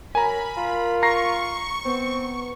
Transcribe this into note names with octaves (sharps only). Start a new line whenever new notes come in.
F#3 A#4 G#5 A#5 B5
F4
A#5 C#6 A#6 C7
B3 C4